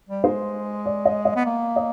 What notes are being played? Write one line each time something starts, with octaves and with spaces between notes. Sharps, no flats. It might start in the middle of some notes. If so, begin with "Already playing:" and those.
G3
G#3 C5
D5
D#5
D#5
B3
A#3
D#5